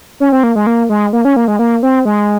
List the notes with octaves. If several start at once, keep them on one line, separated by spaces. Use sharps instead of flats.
C#4
C4
A#3
G#3
A#3
G#3
A#3
C#4
A#3
G#3
A#3
C4
G#3